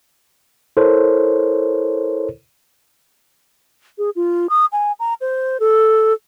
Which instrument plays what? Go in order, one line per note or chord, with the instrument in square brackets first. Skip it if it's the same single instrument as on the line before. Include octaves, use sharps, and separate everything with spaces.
[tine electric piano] E4 A4 A#4 C5 C#5
[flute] G#4
F4
D#6
G#5
A#5
C5
A4